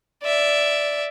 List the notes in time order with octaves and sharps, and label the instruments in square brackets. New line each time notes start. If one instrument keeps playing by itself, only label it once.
[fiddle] D5 E5